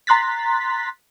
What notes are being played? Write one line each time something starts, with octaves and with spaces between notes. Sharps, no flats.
A#5 C6 F#6 A6 B6